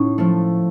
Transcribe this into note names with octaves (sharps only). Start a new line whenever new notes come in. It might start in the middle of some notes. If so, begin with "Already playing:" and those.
Already playing: A2 C#4 D#4
F3 A3